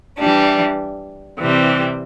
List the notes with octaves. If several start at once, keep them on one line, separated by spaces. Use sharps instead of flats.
E3 G3 D4
C3 E3 G3 C4